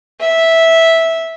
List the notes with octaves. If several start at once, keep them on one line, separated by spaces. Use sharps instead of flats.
E5